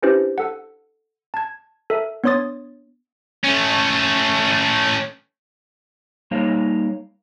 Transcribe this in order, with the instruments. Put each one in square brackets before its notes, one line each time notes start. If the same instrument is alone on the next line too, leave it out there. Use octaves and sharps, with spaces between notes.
[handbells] C#4 D4 E4 G4 B4 C5
A4 F#5
A5 G#6
A4 A#4 E5
B3 D4 C#5 C6 D#6 A6
[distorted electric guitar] A3 C#4
[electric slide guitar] G3 A#3 D#4 A#4 C#5 F5